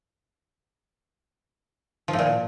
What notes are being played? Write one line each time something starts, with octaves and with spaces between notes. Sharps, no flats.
F3
A2
A#2